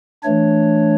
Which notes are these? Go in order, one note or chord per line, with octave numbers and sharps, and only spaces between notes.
E3 A3 D4 C#5